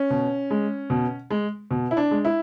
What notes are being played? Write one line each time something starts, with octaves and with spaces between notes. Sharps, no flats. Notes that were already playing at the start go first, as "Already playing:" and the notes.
Already playing: C#4
B2
G#3
B2
G#3
B2
E4
D4
G#3
E4